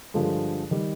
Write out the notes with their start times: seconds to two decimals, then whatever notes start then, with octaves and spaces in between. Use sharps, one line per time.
0.14 G2 D3 F3 G#3
0.71 D#3 G3